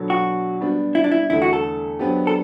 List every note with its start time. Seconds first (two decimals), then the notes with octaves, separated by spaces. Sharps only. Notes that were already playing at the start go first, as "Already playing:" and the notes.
Already playing: B2 F#3 B3 D4 A4
0.10 F#4
0.61 G3 B3 D4
0.95 E4
1.04 D4
1.11 E4
1.30 E2 D3 A3 E4
1.42 F#4
1.53 A4
1.99 F#3 B3 D4 G4 C5
2.27 A4